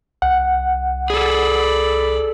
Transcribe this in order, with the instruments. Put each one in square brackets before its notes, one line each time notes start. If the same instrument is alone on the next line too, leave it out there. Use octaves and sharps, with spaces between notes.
[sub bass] C2 [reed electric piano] F#5
[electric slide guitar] G#4 A4 [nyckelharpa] D5 B5